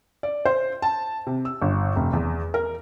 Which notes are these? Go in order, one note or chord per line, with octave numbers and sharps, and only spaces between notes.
D5
C5
A5
C3
E6
G1
F1
E2
A#4